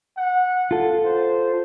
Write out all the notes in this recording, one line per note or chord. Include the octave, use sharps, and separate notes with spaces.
F#5
F4 A4
C5